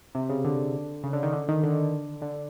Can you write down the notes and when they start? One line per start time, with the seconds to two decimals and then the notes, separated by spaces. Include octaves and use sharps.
0.15 C3
0.30 C#3
0.45 D3
1.04 C#3
1.13 D3
1.23 D#3
1.33 D3
1.48 D#3
1.63 D3
2.22 D3